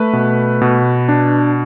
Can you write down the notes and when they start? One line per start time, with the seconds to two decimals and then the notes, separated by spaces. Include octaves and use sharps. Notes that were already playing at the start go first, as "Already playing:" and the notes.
Already playing: A3 B4
0.13 B2
0.62 B2
1.09 D4